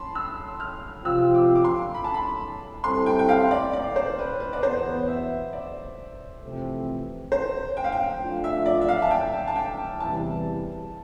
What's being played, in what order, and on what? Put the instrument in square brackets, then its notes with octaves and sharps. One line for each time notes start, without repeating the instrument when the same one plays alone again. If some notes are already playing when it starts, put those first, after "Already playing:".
Already playing: [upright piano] A5 B5 C6
E6
F6
[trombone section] C3 F3 C4 F4 [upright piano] E6
[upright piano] D6
D6
C6
B5
A5
B5
[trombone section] G3 C4 E4 A4 [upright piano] C6
[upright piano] G5
G5
F5
D5
D5
C5
B4
B4
D5
[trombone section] E2 B2 B3 [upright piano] C5
[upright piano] E5
D5
[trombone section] F2 C3 E3 A3 C4
[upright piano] C5
G5
F5
G5
[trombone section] F3 A3 D4 F4
[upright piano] E5
D5
E5
F5
A5
G5
A5
G5
[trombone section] E2 C3 E3 G3 [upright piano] A5